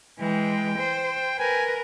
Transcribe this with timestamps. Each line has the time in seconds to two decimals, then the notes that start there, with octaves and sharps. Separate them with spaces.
0.19 E3 G#3 G5
0.78 C5
1.39 A#4 B4 G#5